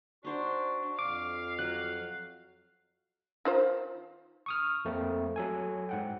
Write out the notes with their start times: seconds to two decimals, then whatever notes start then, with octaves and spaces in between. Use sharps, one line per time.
0.25 D4 D#4 F#4 C5
0.99 F2 F5 D6
1.59 F#3 F#6
3.45 D#3 F4 C5
4.46 C#6 D#6 F6
4.85 F2 A3 A#3 C4
5.36 F#3 A4 G#5
5.89 G#2 F#5 G5